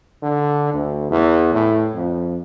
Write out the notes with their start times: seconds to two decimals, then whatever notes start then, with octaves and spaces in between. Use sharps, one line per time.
0.23 D3
0.74 D2
1.11 E2
1.53 A2
1.94 F2